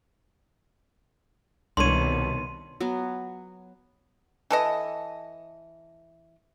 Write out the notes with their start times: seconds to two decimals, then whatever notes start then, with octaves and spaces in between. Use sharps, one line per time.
1.77 C2 B2 D#3 D4 C#5 C6 D#7
2.80 F#3 B3
4.51 E3 A4 D#5